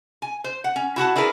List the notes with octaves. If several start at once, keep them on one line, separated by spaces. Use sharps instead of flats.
G#5
C5
F#5
C#4
E4 F#4 F#5 A5
D4 E4 G#4 A#4 B4